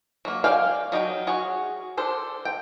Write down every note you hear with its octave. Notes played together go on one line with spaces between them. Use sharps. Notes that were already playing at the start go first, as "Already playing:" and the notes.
F#3 A#3
D5 F5 G5 G#5
F#3 D#4 A#4 G5
F#4 G#4 C#5
D4 A4 C5
G5